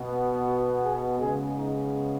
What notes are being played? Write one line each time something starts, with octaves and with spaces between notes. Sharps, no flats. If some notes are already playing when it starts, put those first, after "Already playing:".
Already playing: B2 B3
F#4
G#4
C#3 G#3 B3 G#4
D#4